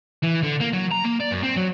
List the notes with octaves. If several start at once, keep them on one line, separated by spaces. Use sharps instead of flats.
E3
D3
A#3
F#3
A#5
A#3
D5
F#2
C4
F#3